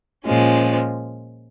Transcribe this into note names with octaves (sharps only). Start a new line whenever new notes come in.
A#2 F3 G#3 C#4